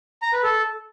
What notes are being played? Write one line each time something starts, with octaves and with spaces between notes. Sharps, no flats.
A#5
B4
A4